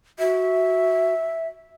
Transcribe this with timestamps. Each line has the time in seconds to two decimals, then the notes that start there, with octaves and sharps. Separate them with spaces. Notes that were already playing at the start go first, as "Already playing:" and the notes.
0.19 F#4 E5